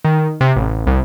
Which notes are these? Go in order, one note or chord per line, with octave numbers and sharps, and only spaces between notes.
D#3
C3
A1
C2